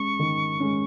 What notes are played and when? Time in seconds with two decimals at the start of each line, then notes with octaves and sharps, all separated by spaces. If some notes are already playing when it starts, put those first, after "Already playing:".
Already playing: G#3 C#4 C#6
0.19 D#3
0.60 G#3 C#4